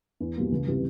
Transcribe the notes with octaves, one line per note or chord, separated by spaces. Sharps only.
E2
B2 G3 A#3
C#2
C3 E3 G3